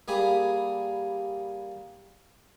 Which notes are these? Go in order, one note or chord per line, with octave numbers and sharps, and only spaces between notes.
G3 A#3 G#4 B5 D#6